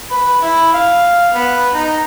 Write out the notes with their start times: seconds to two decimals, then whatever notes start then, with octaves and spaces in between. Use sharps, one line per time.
0.11 B4
0.42 E4
0.73 F5
1.34 B3
1.74 D#4